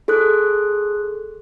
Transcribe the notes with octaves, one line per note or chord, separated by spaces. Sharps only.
G#4 A4 C6 D#6 F#6